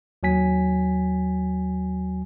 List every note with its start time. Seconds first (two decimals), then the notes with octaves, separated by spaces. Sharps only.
0.23 D#2 F#3 G#5 B6